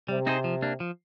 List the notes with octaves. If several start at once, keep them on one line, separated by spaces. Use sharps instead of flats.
C3 G3
C4 D#4 G#4 C5
F3
A#3 D4
F3